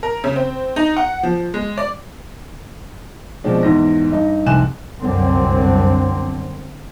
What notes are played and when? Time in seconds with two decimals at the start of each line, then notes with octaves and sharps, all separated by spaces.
0.03 A#4
0.24 C#3
0.36 C4
0.76 D#4
0.97 F#5
1.23 F3
1.54 G#3
1.78 D5
3.44 B2 F3 G#3 C4 D4
3.63 E2 G#2 A#6
4.12 G2 D#4
4.46 C2 F2 G#2 G#5 F#6 E7
4.99 G1 C2 F#2 D3 C4